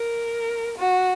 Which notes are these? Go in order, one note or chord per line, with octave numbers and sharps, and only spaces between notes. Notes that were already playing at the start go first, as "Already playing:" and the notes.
Already playing: A#4
F#4